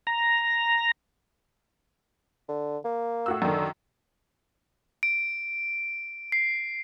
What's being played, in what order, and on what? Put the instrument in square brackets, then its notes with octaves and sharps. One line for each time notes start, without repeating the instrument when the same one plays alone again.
[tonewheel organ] A#5
[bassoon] D3
A#3
[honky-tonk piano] A2 F#4 E6
[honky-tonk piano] F#2 D#3 [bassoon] D3
[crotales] D7
C7